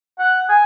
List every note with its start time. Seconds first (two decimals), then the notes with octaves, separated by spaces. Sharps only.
0.19 F#5
0.49 G#5